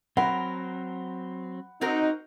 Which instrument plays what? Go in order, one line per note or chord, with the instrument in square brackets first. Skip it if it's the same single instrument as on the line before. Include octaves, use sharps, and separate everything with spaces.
[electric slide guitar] F#3 C4 [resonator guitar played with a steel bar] A#4 [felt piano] F#5 B5
[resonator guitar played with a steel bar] C4 F#4 A#4 [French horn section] D#4